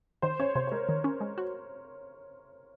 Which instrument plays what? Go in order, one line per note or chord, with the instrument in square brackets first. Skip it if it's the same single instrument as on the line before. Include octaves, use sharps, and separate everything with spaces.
[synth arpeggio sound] D#3 [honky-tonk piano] C5
[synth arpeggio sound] C#4 [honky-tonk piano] C#5
[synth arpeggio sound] C3 [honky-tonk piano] C5
[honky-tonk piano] C5
[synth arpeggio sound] G#3 [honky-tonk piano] A#4
[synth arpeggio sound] D#3
C#4
G#3
F#4